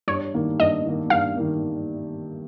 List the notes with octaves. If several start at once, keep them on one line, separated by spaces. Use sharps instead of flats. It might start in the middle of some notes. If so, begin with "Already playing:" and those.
G2 C#5
D#3 A#3
G2 D#5
D#3 A#3
G2 F5
D#3 A#3